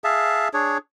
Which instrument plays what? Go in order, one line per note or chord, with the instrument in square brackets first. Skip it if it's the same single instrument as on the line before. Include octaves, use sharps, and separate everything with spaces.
[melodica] G#4 E5 F5 A5
D4 G#4 C#5